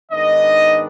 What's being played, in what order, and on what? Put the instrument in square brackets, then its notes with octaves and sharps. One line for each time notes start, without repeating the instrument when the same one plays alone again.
[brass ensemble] G#2 D#3 B3 D4 D#5